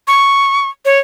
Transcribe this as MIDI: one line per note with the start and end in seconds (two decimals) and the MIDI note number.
0.08 0.69 85
0.85 0.99 73